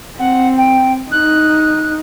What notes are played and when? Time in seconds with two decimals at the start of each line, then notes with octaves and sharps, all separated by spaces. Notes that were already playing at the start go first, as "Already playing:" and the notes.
0.19 C4 F#5
0.57 G5
1.12 D#4 F#6